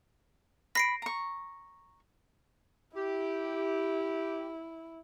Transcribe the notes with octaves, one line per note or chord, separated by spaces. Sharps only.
B5 A#6 C7 D7
A#5 C#6
E4 G4